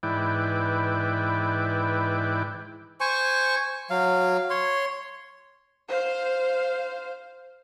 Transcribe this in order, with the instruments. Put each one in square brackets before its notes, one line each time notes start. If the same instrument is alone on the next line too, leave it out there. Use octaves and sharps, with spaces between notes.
[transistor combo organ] G#2 E3 E4 B4 D5 G5
[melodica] C5 G#5 C#6
F#3 F5
C#5 C6
[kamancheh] C5 F5